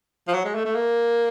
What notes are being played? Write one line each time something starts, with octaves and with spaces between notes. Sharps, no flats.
F3
F#3
G#3
A3
A3
A#3